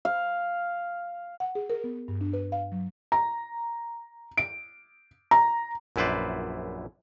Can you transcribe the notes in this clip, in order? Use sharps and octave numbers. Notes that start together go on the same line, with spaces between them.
F5
F#5
G#4
A#4
B3
G2
D4
B4
F5
F#3
A#5
D7
A#5
A#1 F#2 E4 B4 C5 D5